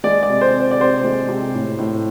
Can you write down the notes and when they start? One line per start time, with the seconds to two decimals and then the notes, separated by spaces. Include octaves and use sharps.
0.04 G#3 D5
0.23 D5
0.29 C3
0.41 C5
0.54 C4
0.60 C5
0.71 D5
0.79 C3 C5
1.04 G#3
1.29 C3
1.54 A2
1.79 A2